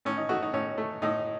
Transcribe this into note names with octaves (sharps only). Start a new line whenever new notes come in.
A2 C#4
D#4
A3 D#4 F#4
D#4
A2 C#4
A3
A2 D#4